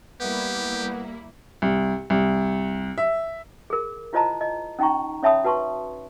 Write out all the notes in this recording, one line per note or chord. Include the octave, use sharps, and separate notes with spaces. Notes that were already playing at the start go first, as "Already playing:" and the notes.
G3 A#3 B3 E4 G4
C2
C2
E5
G#4 A#4
E4 F4 C5 D#5 A5 A#5
D#5
C#4 D#4 G5 A#5 C#6
C#4 C#5 E5 A5 B5 D#6
F#4 B4 A5 C6 C#6